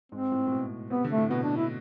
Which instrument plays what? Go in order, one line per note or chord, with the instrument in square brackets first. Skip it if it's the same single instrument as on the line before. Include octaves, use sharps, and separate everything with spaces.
[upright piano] G#2 [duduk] C4
[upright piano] A2
A2
B2
[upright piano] C3 [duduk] B3
[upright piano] D3
[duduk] A3
[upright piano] A2
[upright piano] B2 [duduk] B3
[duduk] D4
E4